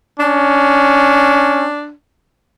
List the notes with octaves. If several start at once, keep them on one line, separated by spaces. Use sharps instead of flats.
C#4 D4